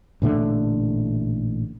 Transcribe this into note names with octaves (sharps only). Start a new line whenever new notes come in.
A1 A#2 D3 A3